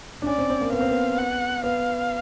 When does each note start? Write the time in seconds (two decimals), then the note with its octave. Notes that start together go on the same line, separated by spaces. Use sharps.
0.22 D4
0.26 C#4 D5
0.38 C4
0.50 C4
0.61 A#3
0.72 B3 F5
0.81 C4
0.89 B3
1.18 F#5
1.64 B3 F5